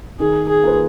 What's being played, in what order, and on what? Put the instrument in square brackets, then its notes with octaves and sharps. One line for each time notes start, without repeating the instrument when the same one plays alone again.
[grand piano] D#3 [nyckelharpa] G#4
[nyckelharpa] G#4
[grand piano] A#3 F4 B4